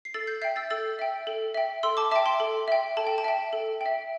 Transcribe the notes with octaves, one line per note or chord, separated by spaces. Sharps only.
C7
A4 E6 A6
G6 C7
E5 G5 G6 C7
E6 A6
A4 E6 A6
E5 G5
A4
E5 G5
A4 C6 E6
A5 D6
E5 G5 A5 D6
G5 C6
A4
E5 G5
A4 A5
G5
A5
E5 G5
A4
E5 G5